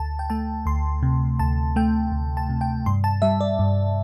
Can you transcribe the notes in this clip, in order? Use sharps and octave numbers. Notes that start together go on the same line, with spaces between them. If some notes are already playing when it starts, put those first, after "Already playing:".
Already playing: D2 A5
G5
A3 A5
D2 C6
C3
D2 A5
A3 G5
D2
A5
C3
G5
G2 C6
A5
G3 E5
D5
G2